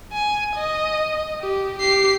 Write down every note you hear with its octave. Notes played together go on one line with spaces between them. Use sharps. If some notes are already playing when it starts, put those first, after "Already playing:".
G#5
D#5
G4
G4 C7